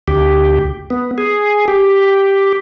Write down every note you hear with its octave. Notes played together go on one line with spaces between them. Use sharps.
D2 G4
B3
G#4
G4